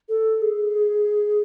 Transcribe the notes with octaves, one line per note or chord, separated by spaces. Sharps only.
A4
G#4